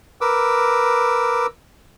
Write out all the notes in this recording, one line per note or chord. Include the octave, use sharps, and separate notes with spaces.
A#4 B4 D6 E6